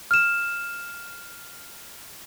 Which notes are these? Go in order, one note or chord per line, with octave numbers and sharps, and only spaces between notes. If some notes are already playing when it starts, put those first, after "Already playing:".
F6 E7